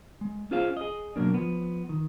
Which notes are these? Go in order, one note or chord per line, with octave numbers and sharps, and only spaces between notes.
G#3
C#4 F4 G#4 C5 F5
G#4 D#5
B2 F#3 A#3 D4
F3 B3
D#3